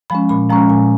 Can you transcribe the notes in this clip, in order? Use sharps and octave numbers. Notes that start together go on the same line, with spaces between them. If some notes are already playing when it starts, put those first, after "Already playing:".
F3 G#3 C#4 B5
A#2 B5
F3 G#3 C#4 A#5
A#2 G#5